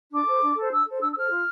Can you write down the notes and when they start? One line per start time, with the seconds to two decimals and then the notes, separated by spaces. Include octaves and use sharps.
0.11 D4 D6
0.26 A4 C5
0.41 D4
0.56 A4 C5
0.71 D4 E6
0.86 A4 C5
1.00 D4 E6
1.11 E6
1.16 A4 C5 F6
1.30 F4